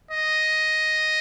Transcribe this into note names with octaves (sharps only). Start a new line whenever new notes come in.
D#5